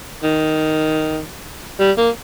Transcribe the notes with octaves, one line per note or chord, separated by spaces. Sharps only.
D#3
G3
A#3